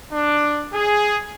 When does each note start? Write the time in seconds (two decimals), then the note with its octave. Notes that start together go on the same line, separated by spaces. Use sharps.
0.13 D4
0.74 G#4